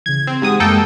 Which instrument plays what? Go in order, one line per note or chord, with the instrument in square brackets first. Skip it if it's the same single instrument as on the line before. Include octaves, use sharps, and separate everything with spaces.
[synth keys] C#3 E3 [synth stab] G#6
[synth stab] C4
[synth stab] G#2 G#3 D#6 [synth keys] G4 F#5
[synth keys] F#2 G#3 [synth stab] A#3 A4 G5